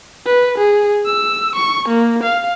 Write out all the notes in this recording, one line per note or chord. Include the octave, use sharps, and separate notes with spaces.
B4
G#4
E6
C#6
A#3
F5